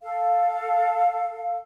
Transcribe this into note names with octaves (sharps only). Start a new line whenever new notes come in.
A4 F5